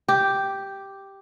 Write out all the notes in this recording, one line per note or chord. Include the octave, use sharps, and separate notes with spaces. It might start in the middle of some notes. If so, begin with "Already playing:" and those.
G4